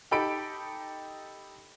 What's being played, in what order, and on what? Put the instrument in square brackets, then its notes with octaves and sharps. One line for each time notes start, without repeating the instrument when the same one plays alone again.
[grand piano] D#4 G4 A4 B5 D7